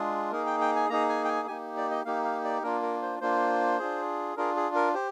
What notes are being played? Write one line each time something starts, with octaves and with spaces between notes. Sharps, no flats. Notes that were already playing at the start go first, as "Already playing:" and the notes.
Already playing: G#3 D4 F4 G#4
A#3 D#4 G#4 A#4
G5
G5
G#5
A#3 D#4 G#4 A#5
G#5
G5
G#5
A#3 D#4 G4 G#5
D5
D#5
A#3 D#4 G4 F5
F5
D5
A#3 D4 F4 A#4
A#4
C5
A#3 D4 F4 C5
D4 F4 G#4
D4 F4 G#4 A#4
G#4
A#4
G4 C5